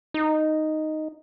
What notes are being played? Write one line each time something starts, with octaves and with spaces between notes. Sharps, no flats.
D#4